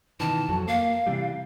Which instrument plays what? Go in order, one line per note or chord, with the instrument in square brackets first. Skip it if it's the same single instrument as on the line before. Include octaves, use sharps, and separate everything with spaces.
[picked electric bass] B2 D#3 E3 [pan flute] A5
[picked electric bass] F2 F#3
[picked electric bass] A#3 [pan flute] F5
[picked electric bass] C3 E3 G3